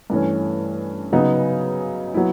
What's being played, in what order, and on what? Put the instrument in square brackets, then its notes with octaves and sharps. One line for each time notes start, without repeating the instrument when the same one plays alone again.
[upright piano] G2 E3 A3 C#4
C#3 F#3 B3 D#4
F#3 B3 E4